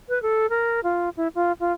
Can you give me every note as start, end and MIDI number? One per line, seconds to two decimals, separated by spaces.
0.09 0.21 71
0.22 0.49 69
0.50 0.80 70
0.83 1.09 65
1.17 1.28 64
1.35 1.52 65
1.60 1.72 65